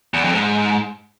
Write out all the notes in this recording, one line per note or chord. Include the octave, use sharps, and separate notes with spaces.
E2
F2
G#2